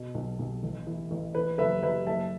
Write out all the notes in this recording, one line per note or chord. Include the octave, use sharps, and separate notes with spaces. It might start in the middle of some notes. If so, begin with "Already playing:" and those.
Already playing: B2
B1
B1
A1
E3
A1
E3 B4
F#1 B4 E5
F#1 B4 E5
F#1 E5 A5